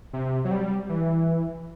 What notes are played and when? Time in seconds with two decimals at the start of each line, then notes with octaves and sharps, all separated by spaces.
0.13 C3
0.45 F#3
0.51 G3
0.89 E3